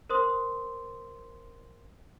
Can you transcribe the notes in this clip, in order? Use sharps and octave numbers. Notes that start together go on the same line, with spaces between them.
A#4 C5 C6 D#6